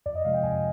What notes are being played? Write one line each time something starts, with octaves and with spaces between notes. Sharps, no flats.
F2 D5
D#5
C3 F3 G#3 F5
G5
F2 G#5